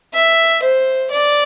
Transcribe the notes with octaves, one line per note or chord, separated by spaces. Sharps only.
E5
C5
D5